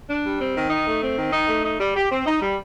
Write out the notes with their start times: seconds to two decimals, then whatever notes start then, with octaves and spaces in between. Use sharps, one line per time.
0.09 D4
0.24 G3
0.39 C4
0.55 D#3
0.70 D#4
0.85 A3
1.02 C4
1.17 D#3
1.33 D#4
1.48 A3
1.63 D#4
1.79 G3
1.95 G4
2.10 C4
2.26 D#4
2.41 G3